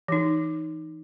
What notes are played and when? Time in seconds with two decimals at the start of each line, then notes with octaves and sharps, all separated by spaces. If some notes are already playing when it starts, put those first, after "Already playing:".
0.08 E3 D#4